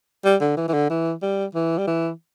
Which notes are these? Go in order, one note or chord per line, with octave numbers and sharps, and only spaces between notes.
G3
D3
E3
E3
D3
E3
G3
E3
G3
E3